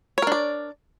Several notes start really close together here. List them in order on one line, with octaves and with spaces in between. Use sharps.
C#5 A#4 D4 D5